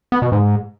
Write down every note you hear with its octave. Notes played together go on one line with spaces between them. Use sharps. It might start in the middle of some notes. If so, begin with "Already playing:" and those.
B3
B2
G#2